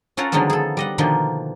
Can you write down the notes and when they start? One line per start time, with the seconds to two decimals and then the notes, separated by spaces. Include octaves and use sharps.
0.17 C#4 F4 A4 A#4 C#5 F#5
0.32 D3 D#3 F3 F#3 G#3 B3
0.50 G#4 A4
0.77 G3 D#5 F#5
0.98 B2 D3 D#3 F3 A#3